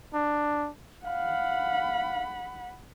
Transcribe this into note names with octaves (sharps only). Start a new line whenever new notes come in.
D4
F5 F#5 B5